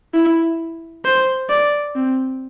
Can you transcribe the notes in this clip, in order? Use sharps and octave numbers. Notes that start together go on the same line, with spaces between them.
E4
C5
D5
C4